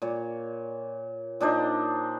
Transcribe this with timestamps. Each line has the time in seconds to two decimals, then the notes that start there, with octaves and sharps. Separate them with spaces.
0.02 A#2 C#5
1.40 A#2 D4 D#4 C5